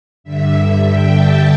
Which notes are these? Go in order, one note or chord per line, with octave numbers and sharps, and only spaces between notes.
G2 D3 E5
G5
A5